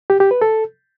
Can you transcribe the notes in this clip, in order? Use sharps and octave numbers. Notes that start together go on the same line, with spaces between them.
G4
G4
B4
A4